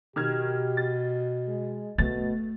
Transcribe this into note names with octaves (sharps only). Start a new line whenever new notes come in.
B2 D#3 G4 F6 G#6
A6
G#3
B2 A3 A6